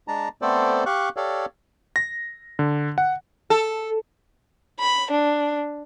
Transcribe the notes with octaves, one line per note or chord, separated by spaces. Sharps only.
G#3 D4 A5 A#5
A3 B3 C4 A4 C5 D5
G4 F5 C#6 F#6
G4 A4 C#5 D5 F5
A#6
D3
F#5
A4
B5
D4